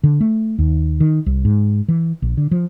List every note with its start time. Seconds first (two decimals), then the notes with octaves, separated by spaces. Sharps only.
0.04 D3
0.20 A3
0.58 D#2
1.00 D#3
1.26 C2
1.45 G#2
1.88 E3
2.22 A#1
2.37 D3
2.51 F3